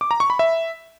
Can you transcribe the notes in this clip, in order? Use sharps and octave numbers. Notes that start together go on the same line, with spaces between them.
D6
A#5
C#6
B5
E5